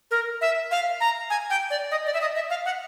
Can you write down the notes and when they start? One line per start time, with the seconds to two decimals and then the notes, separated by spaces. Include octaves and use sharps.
0.11 A#4
0.41 E5
0.71 F5
1.01 A#5
1.30 G#5
1.50 G5
1.70 D5
1.91 D#5
2.06 D5
2.14 E5
2.21 D#5
2.35 E5
2.50 F5
2.65 F#5